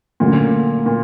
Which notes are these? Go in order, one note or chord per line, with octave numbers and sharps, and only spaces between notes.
D2 A#2 D3 F#3 A3 C#4
A#2